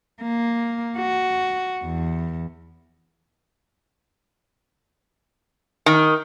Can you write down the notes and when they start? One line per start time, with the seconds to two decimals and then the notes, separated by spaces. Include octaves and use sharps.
0.22 A#3
0.98 F#4
1.84 E2
5.86 D#3